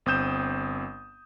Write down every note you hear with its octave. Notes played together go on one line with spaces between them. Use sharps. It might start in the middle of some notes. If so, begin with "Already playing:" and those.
G1 C4 D#6 G6 E7